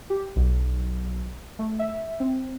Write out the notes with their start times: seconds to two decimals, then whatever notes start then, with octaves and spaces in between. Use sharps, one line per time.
0.10 G4
0.36 B1
1.59 A3
1.79 E5
2.20 C4